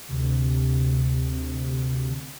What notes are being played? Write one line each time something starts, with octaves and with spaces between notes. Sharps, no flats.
D2 C3